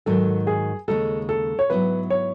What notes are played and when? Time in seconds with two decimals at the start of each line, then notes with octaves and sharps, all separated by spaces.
0.06 G#2 D#3 F#3 A4
0.47 G#4
0.88 D#2 C#3 G#3 D#4 A4
1.29 A4
1.59 C#5
1.70 G#2 F#3 B3 E4 B4
2.10 C#5